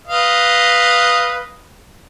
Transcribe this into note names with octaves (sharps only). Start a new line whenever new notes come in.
B4 D#5 F5